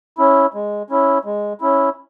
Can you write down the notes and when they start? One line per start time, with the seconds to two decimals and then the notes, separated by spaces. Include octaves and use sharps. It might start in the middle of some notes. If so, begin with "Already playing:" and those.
0.18 C#4 E4
0.54 G#3
0.90 C#4 E4
1.25 G#3
1.61 C#4 E4